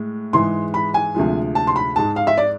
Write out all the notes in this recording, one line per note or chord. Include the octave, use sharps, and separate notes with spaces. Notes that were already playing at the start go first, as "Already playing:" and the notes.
Already playing: A2 G#3
G#2 E3 G#3 C6
B5
G#5
D2 C3 F3 G#3
A5
C6
B5
G#2 G#3 A5
F5
E5
D5